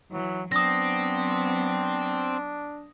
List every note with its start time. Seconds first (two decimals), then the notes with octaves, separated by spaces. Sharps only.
0.12 E3 F#3
0.52 F#3 B3 C4 D4 D#6 A#6